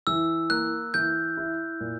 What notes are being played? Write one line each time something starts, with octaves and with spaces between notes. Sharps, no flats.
E3 E6
A#3 F#6
E3 G6
E4
A#2